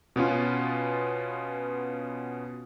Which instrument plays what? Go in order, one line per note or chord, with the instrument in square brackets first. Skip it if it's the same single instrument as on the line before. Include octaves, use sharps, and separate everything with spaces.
[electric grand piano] B2 B3 C#4 F4